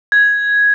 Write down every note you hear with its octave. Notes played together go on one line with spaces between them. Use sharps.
G#6